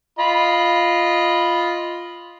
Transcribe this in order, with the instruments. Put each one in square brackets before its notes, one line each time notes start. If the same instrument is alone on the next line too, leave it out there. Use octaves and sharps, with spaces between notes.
[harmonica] F4 D#5 B5